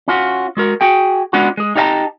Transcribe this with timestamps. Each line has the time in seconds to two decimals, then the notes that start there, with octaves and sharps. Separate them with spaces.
0.08 C#4 F4 F#4
0.57 G#3 F#4 A#4
0.81 F#4 G#4 G5
1.33 G#3 B3 C#4 D4 F4 F#4
1.57 G#3 G#4
1.76 D#4 G4 D5 F5 A5 A#5